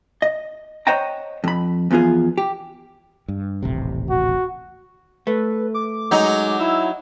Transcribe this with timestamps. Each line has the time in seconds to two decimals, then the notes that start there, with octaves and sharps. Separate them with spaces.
0.22 D#5
0.87 C5 C#5 D#5 F#5 G5 A#5
1.44 F2 B5
1.91 E2 F3 B3 F4 G#4
2.38 G4
3.28 G2
3.63 D#1 A1 C3
4.10 F#4
5.27 A3 B4
5.74 D6
6.11 F#3 G#3 D#4
6.60 E4 E6